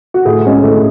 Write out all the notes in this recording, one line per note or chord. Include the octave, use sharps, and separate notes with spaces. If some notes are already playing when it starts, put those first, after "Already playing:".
F#4
A2 G#4
G#3 C#4
A2